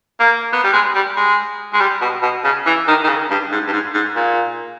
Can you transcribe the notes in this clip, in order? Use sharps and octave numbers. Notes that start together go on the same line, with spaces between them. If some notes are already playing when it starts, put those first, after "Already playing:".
A#3
B3
G3
G#3
G3
G#3
G#3
G3
B2
B2
C#3
E3
D#3
D#3
C#3
G2
G#2
G2
G#2
G#2
A#2